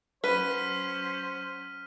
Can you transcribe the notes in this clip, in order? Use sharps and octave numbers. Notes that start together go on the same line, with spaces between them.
F#3 C#4 B4 C5 F6 B6 D#7